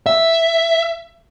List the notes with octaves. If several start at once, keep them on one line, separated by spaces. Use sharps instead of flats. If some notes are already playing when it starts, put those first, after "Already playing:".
E5